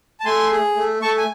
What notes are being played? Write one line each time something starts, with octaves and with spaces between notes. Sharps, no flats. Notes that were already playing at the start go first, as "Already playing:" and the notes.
A5
A3 G#5 C6
G#4
A3
A3 A5 C#6
G#5